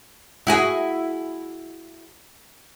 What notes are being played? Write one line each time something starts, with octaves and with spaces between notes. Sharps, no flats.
E4 F#4 G#4